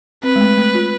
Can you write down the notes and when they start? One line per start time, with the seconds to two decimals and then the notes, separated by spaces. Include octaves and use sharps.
0.23 C4 B4
0.36 G#3
0.41 A3
0.58 A3
0.75 F4